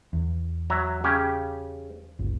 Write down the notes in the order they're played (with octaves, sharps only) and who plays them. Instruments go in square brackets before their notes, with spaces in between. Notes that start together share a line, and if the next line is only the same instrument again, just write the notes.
[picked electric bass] E2
[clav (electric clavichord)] F#3 E5 A#5
C#3 C#4 G4
[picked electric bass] G1 C#2